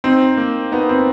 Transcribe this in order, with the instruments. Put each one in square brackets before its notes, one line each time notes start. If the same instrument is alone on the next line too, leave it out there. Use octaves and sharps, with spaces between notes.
[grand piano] C4 [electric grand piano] D#4
[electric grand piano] A#3
[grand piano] B3 [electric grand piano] D#4
[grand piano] C4